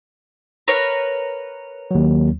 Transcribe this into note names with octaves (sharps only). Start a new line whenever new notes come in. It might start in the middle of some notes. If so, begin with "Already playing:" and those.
A#4 B4 C#5
D#2 F#3